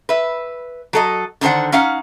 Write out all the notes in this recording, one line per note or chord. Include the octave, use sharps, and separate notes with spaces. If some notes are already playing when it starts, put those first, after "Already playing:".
B4 E5
F#3 A4 D#5
D3 D#3 D4 C5 F#5
C#4 D#4 F5 F#5